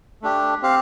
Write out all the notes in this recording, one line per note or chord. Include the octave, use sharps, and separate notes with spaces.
A3 D4 G4
C4 G4 F5